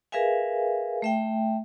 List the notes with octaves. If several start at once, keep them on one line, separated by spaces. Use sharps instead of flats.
G#4 A#4 B4 E5 F5 G#5
A3 E5 G5